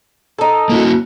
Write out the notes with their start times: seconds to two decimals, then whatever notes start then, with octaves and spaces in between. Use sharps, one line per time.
0.38 D#4 A4
0.70 A#3 E4 F#4